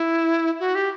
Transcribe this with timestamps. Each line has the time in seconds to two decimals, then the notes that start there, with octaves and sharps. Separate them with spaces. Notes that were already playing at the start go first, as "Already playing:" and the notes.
Already playing: E4
0.60 F#4
0.75 G4